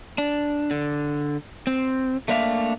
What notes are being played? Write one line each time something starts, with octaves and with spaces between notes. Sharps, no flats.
D4
D3
C4
A3 A#3 D4 E5 F5